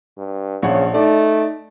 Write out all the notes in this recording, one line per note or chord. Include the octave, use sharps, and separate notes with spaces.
G2
A#1 C#3 C#5 F#5
A3 D#4 D5